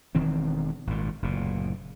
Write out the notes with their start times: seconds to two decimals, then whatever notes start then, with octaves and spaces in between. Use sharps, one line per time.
0.15 E1 D#3 E3 C4
0.87 G#1 A#2
1.22 F#1 D2 A#2